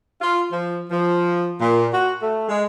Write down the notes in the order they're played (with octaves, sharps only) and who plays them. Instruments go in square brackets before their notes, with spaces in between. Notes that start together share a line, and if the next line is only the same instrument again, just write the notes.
[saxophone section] F4
F3
F3
A#2
F#4
A3
G#3